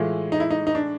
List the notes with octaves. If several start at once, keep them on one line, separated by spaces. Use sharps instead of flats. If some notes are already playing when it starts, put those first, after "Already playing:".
Already playing: A2 E3 G#3 F4
D#4
E4
D#4
D#4
D4